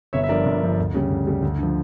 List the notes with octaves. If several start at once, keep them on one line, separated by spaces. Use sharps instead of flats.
G1 C#5 E5
E5
G2 F3 A#4 D5
G1
G2 F3
D2
C#3 G3
D2
C#3 G3
D2
D3 F3